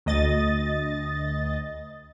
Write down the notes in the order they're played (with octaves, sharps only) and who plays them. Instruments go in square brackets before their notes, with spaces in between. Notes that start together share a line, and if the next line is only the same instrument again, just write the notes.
[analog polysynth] D2 D#5 A6